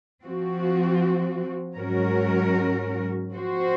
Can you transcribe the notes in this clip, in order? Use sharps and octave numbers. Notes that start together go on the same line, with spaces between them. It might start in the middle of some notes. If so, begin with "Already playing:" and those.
F3 C4 F#4
G#2 F#3 C#4 F#4 A#4
F3 C4 F#4 C5